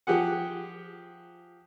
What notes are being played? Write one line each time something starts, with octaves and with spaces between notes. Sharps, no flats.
F3 G4 G#4 F#5